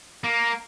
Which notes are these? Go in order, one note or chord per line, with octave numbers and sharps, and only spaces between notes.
A#3